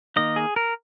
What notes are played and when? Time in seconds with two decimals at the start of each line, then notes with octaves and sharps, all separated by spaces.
0.16 D#3 A#3 D#4 D#5
0.36 G#4
0.56 A#4